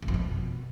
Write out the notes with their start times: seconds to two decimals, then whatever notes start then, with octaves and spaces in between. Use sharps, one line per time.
0.02 F#2
0.08 F2
0.14 B2